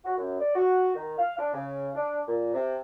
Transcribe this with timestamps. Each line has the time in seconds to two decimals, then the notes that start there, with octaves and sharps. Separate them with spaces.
0.05 F#4
0.18 F#2
0.39 D5
0.56 F#4
0.96 D#3
1.18 F5
1.38 D4
1.53 C#3
1.95 D4
2.28 A#2
2.54 C3